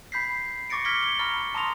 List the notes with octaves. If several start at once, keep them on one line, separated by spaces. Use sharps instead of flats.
B5 G6 B6 C7
C#6 D6 A6 A#6 C#7 D7
F6 G#6 A#6 B6 C#7 G7
G7
A#5 B5 C#6 F6 A6 A#6
A5 A#5 C6 D#6 A#6 F7